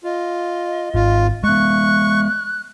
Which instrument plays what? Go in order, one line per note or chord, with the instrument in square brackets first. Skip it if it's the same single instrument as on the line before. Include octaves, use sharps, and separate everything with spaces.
[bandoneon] F4 [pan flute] D#5
[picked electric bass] G#1 [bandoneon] F4
[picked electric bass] G#3 B3 [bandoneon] C#6 [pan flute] F#6